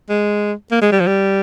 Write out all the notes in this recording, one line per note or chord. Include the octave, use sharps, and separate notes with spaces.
G#3
A#3
G#3
G3
F3
G3